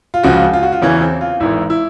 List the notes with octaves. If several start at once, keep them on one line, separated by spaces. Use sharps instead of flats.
F4
C#2 C#3 F3 F#4
F4
F#4
F4
E2 C#3 E3 C#4
C4
F4
G#1 G#2 E3 E4
E4